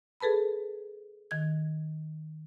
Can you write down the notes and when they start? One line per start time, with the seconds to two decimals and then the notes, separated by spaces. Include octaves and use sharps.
0.20 G#4 A4 B4 A5 B5
1.31 D#3 G#6